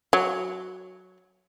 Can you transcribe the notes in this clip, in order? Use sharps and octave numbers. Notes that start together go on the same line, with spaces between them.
F#3